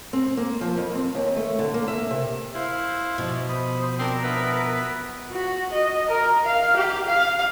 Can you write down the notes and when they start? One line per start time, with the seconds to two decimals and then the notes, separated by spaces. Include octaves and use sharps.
0.13 C4
0.37 A#3
0.61 F3
0.77 F2
0.95 C4
1.15 D#2
1.36 A3
1.59 D3
1.74 A#3
1.88 E5
2.10 C3
2.55 E4 C5 F5
3.18 B2 F3
3.49 C5 B5 D#6
3.99 C4 D4 A#4
4.24 B3 B4 E5
5.31 F#4
5.72 D#5
6.09 A#4
6.45 F5
6.76 G4
7.07 F5